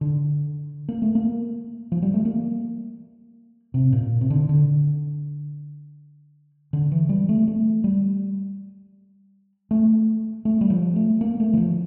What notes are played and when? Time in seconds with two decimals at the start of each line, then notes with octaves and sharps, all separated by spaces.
0.01 D3
0.89 A#3
1.02 A3
1.15 A#3
1.92 F3
2.02 G3
2.14 A3
2.25 A#3
3.74 C3
3.93 A#2
4.21 C3
4.30 D3
4.49 D3
6.73 D3
6.92 E3
7.09 G3
7.29 A3
7.48 A3
7.84 G3
9.71 A3
10.45 A3
10.61 G3
10.70 F3
10.96 A3
11.21 A#3
11.40 A3
11.53 E3
11.57 F3